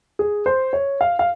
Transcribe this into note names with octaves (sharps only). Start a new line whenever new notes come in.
G#4
C5
C#5
F5
F5